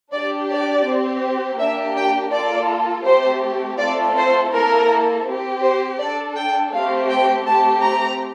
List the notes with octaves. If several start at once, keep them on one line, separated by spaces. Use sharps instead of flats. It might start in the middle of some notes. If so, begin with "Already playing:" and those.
D4 G4 D5
D5
C4 G4
A#3 D4 G4 E5
G5
A#3 F4 A4 D5
A3 C4 G4 C5
A3 C4 F4 A4 D5
C5
A#3 E4 A4 A#4
C4 G4
C5
D4 A4 D5
G5
A3 C4 G4 F5
G5
A3 C4 G4 A5
A#5